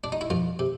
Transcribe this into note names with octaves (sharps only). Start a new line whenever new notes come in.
D4
D#4
E4
F2 F4
C3